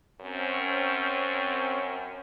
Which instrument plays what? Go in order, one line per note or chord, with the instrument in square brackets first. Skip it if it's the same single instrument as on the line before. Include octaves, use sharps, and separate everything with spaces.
[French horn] F#2 [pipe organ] C4 C#4